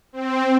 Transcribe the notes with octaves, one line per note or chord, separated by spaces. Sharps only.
C4